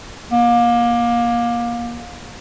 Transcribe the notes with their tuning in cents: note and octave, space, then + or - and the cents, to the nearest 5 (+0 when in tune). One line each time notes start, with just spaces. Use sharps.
A#3 +25